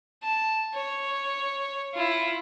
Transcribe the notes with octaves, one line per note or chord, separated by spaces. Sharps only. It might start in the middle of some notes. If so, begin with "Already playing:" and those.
A5
C#5
E4 F4